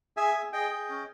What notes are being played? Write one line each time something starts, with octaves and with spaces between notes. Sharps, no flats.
G#4 E5 G#5
G#4
G#4 D#5 G5
G#4
C#4